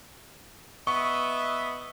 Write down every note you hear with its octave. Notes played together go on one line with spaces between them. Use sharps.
B3 D#5 E5 C#6